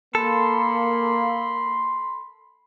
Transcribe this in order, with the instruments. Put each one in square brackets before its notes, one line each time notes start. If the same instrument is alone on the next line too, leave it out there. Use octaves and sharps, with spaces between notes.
[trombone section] A#3 [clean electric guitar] A4 [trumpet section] B5 C6